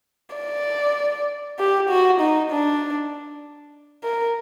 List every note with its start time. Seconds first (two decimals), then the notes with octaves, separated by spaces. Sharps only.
0.36 D5
1.59 G4
1.89 F#4
2.21 D#4
2.50 D4
4.04 A#4